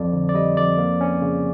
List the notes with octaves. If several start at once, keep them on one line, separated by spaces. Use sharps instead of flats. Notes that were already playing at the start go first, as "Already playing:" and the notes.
Already playing: F2 D5
D3
D5
G3 D#5
F2 D5
A#3
C#4
C#3